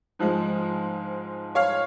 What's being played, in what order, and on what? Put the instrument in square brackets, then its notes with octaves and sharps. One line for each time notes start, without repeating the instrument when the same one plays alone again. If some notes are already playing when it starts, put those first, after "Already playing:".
[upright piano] G#2 F3 G#3
C#5 F5